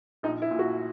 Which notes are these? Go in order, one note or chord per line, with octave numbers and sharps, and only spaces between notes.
A#1 D#4
E4
A#2
F#4